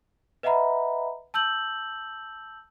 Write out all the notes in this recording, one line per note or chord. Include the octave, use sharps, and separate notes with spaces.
B4 D#5 E5 F#5 A#5 B5
A5 E6 G6 F#7